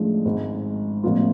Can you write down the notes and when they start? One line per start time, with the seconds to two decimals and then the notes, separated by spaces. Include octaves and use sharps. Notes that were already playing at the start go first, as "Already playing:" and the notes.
Already playing: A1 A2 F3 G#3 D4
0.25 G#1 G#2 G#3
1.03 A1 A2 F3 B3 F4